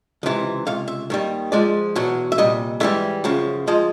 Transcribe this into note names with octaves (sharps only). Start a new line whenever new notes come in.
C#2 C3 E3
C#2 C3 F5
E5
D#2 D#3 G3
G#2 F3 G#3 D5
E2 B2 F#3
E5
C2 A#2 G3 D#5
G#2 E3 G3 E5
F#2 C#3 F3
G#2 F3 G#3 D#5